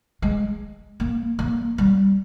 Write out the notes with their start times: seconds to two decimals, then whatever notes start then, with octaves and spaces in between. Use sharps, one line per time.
0.22 G#3
1.00 A#3
1.39 A#3
1.78 G3